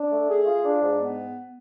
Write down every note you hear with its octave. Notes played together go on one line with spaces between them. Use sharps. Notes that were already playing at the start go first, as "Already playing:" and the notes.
Already playing: D4
A3
G#4
F4
D4
G#2
B3